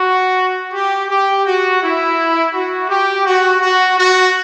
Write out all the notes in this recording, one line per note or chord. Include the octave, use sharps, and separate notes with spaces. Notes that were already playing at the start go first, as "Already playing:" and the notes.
Already playing: F#4
G4
G4
F#4
E4
F#4
G4
F#4
F#4
F#4